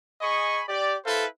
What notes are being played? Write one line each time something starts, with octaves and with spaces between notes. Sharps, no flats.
G#4 D#5 G#5 B5 C#6
G4 D5
E4 A4 B4 C5 E5 F5